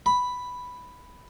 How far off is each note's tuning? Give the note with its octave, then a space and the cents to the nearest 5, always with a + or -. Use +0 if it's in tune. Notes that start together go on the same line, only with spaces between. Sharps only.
B5 +0